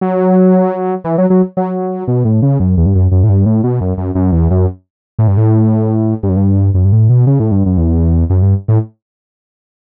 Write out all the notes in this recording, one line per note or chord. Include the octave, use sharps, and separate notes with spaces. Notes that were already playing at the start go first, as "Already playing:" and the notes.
F#3
E3
F#3
F#3
F#3
B2
A2
C#3
F#2
E2
G2
F#2
F#2
A2
G2
A2
B2
F#2
F#2
F#2
E2
F#2
A2
G2
A2
G2
F#2
G2
F#2
G2
A2
B2
C#3
A2
G2
F#2
E2
F#2
G2
A2